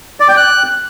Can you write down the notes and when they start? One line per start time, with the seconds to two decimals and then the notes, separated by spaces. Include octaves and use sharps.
0.20 D5
0.28 G5
0.37 F#6